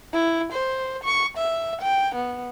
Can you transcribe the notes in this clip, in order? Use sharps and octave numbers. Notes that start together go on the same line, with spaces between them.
E4
C5
C#6
E5
G5
B3